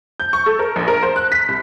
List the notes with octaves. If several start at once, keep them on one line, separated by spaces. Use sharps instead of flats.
G6
C#6
A4
A#4
A#1
A#4
C5
F#6
B6
C2